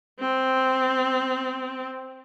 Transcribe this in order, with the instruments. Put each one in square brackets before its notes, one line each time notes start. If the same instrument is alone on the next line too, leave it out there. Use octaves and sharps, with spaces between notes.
[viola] C4